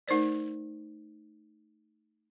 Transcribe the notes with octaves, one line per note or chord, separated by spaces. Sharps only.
A3 D#4 A#4 C5 D5